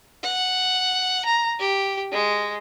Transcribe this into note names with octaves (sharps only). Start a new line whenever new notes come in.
F#5
A#5
G4
G#3